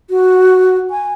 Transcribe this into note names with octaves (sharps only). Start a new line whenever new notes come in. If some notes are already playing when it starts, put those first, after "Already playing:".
F#4
G#5